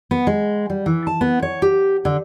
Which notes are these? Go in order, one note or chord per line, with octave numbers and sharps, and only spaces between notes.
B3
G#3
G3
E3
A5
B3
C#5
G4
D3